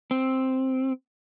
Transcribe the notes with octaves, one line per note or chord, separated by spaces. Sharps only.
C4